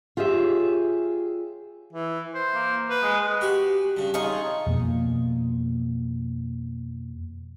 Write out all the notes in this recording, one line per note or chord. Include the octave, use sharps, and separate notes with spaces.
F4 G4 G#4 C#5 E5
E3
C5
A#3
B4
G#3
F#4 G4
G2 C#3
D#4 F4 G#4 C#6
F2 B2 A#3